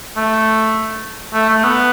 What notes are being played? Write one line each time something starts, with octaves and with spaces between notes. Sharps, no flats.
A3
A3
A3
B3